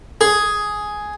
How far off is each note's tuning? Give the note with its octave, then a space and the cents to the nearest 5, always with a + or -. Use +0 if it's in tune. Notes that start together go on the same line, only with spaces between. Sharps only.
G#4 +5